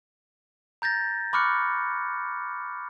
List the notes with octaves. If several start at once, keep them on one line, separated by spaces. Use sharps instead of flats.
A#5 G6 A6 A#6
B5 C#6 D6 F6 F#6 C#7